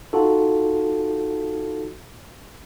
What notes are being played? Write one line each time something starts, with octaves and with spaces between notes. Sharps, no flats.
D#4 F4 F#4 A4